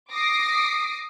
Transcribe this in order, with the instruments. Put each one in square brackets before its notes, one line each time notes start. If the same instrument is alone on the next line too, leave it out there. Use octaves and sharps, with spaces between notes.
[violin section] D6 D#6 A#6 C7 D7